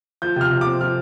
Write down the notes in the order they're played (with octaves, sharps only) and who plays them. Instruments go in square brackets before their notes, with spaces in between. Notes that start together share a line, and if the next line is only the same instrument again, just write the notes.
[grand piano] F3 G6
C3 F6
C3
C4 D6
F3 F6